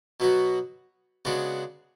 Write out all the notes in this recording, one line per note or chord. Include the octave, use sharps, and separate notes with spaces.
B2 F#3 B3 F#4
C#3 G#3 B3 D4 F#4